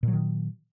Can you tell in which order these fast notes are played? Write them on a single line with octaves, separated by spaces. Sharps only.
A#2 F#3 D#3